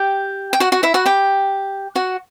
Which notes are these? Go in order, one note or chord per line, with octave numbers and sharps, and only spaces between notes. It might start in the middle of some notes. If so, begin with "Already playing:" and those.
Already playing: G4 G5
G5
F#4 F#5
F#4 F#5
E4 E5
F#4 F#5
G4 G5
F#4 F#5